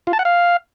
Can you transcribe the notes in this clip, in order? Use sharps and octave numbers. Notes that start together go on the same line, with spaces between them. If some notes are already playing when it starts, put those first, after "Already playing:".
F4
A5
F#5
F5